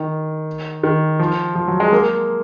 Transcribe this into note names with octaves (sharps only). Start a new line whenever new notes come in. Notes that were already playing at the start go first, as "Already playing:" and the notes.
Already playing: D#3
D#3
F3
F3
F#3
G#3
A#3